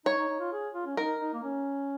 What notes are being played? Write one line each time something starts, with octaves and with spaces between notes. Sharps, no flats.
D#4 C#5
D#4
D#4
F4
G#4
F4
C#4
D#4 A#4
D#4
A#3
C#4